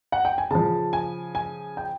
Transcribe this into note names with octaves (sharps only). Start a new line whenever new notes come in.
F#5
G5
G#5
C#3 F3 A5
G#5
G#5
G5